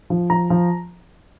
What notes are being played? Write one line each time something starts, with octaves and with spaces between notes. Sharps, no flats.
F3
F3 A#5
F3